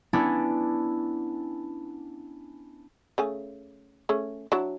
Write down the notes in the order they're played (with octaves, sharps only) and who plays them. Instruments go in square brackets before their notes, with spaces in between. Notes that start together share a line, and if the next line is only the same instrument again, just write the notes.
[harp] B3 C#4 D4 E4
[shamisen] C#3 A3 G#5
A3 C#4 G#4
F#3 D4 E4